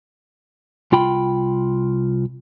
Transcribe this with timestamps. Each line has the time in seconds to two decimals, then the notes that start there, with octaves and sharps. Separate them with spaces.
0.92 C2 F4 G5 B5